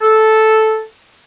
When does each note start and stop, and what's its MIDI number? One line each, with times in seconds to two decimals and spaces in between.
0.01 0.81 69